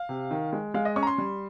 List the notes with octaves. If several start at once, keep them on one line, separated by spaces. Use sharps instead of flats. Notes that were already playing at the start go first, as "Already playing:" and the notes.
Already playing: F5
C3
D#3
G#3
G#3 F5
D#5
C#4 C#6
A#5
C6
G3